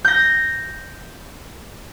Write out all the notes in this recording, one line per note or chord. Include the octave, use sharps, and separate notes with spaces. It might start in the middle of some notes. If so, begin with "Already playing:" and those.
G6 A#6